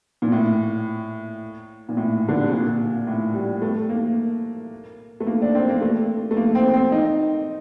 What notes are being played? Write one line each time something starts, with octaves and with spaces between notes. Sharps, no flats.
A#2
A2
A#2
A2
D3
C3
A#2
A2
G3
A3
A#3
A3
A#3
D4
C4
A#3
A3
A3
A#3
C4
C4
D#4